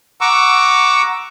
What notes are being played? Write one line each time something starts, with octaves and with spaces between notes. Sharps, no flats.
F#5 A#5 C#6 D6 E6